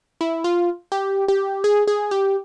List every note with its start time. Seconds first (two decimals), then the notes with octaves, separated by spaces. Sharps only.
0.21 E4
0.44 F4
0.92 G4
1.28 G4
1.64 G#4
1.87 G#4
2.11 G4